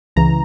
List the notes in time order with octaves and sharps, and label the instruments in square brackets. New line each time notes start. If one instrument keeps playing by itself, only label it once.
[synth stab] C#2 C#3 E3 A#5